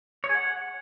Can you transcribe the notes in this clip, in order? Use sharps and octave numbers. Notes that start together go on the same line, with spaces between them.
C#5
G#4
F#5